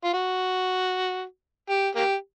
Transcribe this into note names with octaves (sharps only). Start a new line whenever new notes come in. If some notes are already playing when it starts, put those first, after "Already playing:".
F4
F#4
G4
A#3 G4